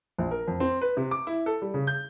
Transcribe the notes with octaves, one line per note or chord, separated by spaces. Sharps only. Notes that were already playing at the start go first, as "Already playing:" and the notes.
A#1
A#4
F2
C4
B4
C3
D6
E4
A4
G3
C#3
G6